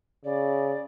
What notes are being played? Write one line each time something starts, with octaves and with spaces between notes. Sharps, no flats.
C#3 D5